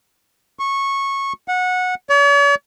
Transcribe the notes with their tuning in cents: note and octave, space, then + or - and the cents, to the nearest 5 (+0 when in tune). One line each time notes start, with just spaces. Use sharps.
C#6 -15
F#5 -20
C#5 +45